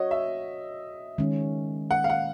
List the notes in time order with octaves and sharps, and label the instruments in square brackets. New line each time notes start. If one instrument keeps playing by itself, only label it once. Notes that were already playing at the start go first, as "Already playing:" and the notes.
Already playing: [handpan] F#4 C#5 [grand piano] D#5
[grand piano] E5
[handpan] D#3 G#3 C#4
[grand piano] F#5
F5
F#5